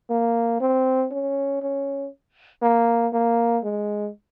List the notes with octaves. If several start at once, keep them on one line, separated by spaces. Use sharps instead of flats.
A#3
C4
C#4
C#4
A#3
A#3
G#3